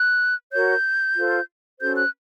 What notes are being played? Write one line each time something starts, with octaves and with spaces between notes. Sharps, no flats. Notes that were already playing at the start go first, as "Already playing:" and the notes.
Already playing: F#6
F#4 A#4 C#5 G6
F4 A4 C5
C#4 F#4 A4 C5 G6
F#6